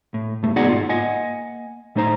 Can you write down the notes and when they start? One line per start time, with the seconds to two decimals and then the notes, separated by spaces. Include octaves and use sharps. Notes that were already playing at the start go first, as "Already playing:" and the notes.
0.14 A2
0.42 C2 G2 A3
0.56 B3 D#4 F#4 G#4 D5 F#5
0.68 G#2 F4
0.89 A#3 D#5 F#5 G#5
1.95 A2 A3 D#4 C5 A#5